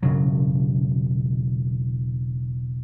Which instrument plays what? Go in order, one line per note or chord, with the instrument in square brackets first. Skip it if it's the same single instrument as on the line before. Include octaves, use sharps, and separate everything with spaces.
[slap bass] E1 C#3 F#3